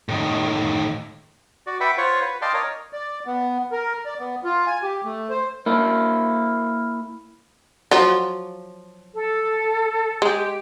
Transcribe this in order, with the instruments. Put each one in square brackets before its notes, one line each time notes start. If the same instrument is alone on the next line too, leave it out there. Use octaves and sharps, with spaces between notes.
[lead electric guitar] A2 D#3
[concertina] F#4 D5
B4 E5 F#5 G5 B5
F4 C5 C#5 F#5 C#6
B4
D5 D#5 F5 G5 A5 C6
A#4 C#5 D#5
[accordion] D5
B3
A#4
D5
B3
F4
G#5
G4
A3
C5
[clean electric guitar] A#3 E4
[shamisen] F3 F#3 F4
[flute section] A4
[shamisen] G#3 [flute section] G4